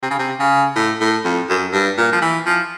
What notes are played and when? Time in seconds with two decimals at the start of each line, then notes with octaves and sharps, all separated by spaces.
0.03 C3
0.11 C#3
0.19 C3
0.40 C#3
0.76 A2
1.01 A2
1.24 F2
1.49 F#2
1.73 G2
1.98 A#2
2.12 F3
2.22 E3
2.46 F3